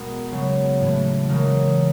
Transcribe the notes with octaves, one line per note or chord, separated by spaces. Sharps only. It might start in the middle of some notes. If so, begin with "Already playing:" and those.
Already playing: B2 G#3 B3 A#4
C#3 F#3 B3
A2 E3 A3
C#3 E3 G#3 A#4